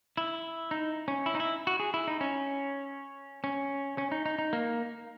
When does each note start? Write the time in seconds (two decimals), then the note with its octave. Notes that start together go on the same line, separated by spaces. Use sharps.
0.17 E4
0.71 D#4
1.08 C#4
1.26 E4
1.35 D#4
1.40 E4
1.67 F#4
1.80 G#4
1.94 E4
2.08 D#4
2.21 C#4
3.44 C#4
3.98 C#4
4.12 D#4
4.26 D#4
4.39 D#4
4.53 A#3